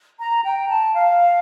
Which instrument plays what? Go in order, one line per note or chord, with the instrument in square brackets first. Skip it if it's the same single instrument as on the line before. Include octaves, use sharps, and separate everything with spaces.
[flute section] A#5
G5
A5
F5